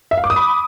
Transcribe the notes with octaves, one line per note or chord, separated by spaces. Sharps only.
E5
F5
D6
D#6
B5